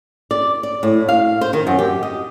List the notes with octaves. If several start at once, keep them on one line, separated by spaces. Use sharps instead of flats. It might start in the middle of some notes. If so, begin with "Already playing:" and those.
D5
D5
A2
F5
C5
D#3
F#2
G4
D#5